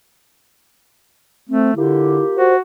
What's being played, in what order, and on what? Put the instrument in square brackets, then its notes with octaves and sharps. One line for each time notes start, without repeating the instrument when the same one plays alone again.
[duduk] A3 [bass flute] C4
[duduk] D3 [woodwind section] A#3 F4 G4 [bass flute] E4
[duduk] F#4 [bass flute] C5